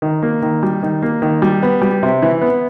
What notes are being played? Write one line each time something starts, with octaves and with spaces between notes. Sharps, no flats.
D#3
A#3
D#3
G3
D#3
A#3
D#3
G3
B3
G3
C3
E3
B3